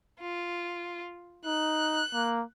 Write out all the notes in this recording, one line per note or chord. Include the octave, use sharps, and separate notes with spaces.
F4
D#4 F#6
A#3